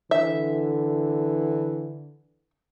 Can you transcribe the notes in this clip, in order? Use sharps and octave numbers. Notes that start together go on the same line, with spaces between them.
D3 E3 E5